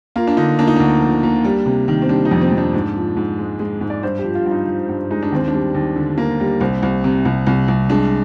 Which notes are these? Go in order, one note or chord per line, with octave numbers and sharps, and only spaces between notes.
A#3 F4
D4
D3 D#4
A#3 D4
D#4
D2 D4
F3
A#3
G3
C3
D#3
C4
G3 D4
D#4
F2
C4
F2
D4
G#2
F3
G#2
G#3
G#3
G#2
D5
G2 C5
G4
F3
F4
G2
D#4
F3
G2
G#3 D#4
D4
D#2 C4
D4
G3
D#2
D3
A#3
G3
C2 C4
C2
C3
C2
C2
C2
G#3 D4